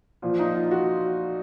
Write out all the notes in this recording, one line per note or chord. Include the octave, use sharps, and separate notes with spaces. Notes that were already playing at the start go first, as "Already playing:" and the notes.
A#2 F3
D#4
F4
F#4